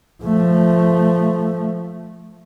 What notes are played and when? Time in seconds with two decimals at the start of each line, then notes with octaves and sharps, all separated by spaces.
0.24 F3 A3